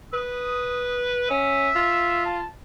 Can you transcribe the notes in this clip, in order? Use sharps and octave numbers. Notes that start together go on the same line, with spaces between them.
B4 D#6
C#4 E5
F4
A5